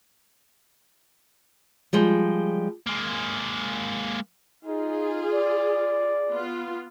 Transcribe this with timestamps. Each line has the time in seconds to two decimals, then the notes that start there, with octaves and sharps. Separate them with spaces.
1.93 F3 G3 G#3
2.87 G#3 A#3
4.65 D#4 F4 G#4
5.33 D5
6.31 B3 F4